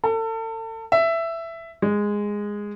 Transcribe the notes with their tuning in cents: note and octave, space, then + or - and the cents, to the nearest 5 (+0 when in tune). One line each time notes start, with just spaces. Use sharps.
A4 +35
E5 +10
G#3 -10